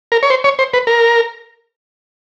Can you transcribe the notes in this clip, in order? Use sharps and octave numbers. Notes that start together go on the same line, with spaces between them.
A#4
C#5
C5
C#5
C5
B4
A#4